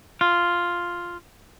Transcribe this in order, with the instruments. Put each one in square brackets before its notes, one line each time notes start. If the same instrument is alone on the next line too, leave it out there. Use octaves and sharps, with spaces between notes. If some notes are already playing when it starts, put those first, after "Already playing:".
[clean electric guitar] F4